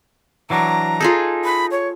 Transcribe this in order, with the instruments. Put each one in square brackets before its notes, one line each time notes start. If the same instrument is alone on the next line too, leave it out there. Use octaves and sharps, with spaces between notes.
[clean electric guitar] E3 F#3 D4 [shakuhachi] A#5
[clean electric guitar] D#4 [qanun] F4 G#4 A4
[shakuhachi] B5
C#5